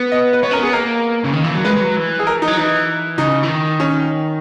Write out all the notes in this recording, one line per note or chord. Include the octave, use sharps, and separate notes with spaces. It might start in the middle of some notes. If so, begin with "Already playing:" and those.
Already playing: B3
D#5
B4
B3 C#5
C#4 A#4
B3 G#4
A#3 A#4
C#3
D#3
E3
F#3
G#3 B4
G#3
F#3
E3
G#4
A#4
D#4
F#3
E3 D#4
C#3 D#4
E3
D#3
C#4